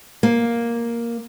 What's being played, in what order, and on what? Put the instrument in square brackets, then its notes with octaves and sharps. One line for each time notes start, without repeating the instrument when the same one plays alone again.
[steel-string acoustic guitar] A#3